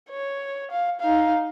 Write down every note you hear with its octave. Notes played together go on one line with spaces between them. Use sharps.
C#5
F5
D#4 F5